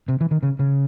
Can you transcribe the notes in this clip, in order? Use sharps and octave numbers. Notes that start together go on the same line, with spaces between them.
C3
E3
D#3
C#3
C#3